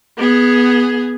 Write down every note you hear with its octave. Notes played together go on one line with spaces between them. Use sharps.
B3 G#4